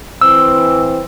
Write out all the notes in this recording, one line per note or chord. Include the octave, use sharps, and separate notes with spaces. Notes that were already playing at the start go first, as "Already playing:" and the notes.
E3 C4 E6